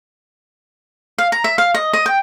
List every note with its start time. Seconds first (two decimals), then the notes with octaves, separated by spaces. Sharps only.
1.18 F5
1.32 A#5
1.44 E5
1.58 F5
1.74 D#5
1.93 D#5
2.06 G5